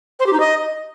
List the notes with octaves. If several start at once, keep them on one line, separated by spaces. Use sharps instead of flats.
C5
G4
D#4
D#5